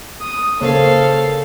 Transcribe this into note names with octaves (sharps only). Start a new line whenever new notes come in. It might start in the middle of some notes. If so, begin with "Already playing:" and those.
D#6
C#3 A#3 A4 C5 C#5 F5